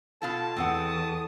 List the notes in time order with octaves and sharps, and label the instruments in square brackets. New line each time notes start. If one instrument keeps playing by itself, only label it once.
[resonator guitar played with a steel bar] B2 F4 A4 [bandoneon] A5
[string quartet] E2 D#6 [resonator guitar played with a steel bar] C4 A4 F#5